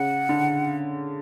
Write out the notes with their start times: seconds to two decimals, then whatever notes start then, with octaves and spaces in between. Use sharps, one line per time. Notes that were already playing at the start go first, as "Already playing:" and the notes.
Already playing: C#3 F#5
0.29 D3